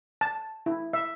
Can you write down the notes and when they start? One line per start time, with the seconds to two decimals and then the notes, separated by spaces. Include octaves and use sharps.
0.21 A5
0.66 E4
0.93 E5